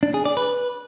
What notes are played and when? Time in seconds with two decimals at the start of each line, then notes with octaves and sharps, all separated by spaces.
0.03 D4
0.14 G#4
0.25 D5
0.37 B4